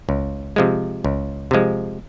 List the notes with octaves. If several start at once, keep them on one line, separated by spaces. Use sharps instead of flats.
C#2
C3 F3 G#3
C#2
C3 F3 G#3